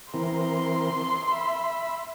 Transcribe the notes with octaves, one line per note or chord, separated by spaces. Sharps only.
E3 C4 A#4 C6
E5 B5